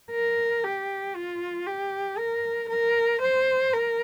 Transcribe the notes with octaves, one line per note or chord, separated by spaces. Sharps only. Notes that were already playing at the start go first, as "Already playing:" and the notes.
A#4
G4
F4
G4
A#4
A#4
C5
A#4